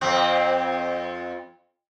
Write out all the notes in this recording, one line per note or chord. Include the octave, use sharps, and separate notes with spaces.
F2 C4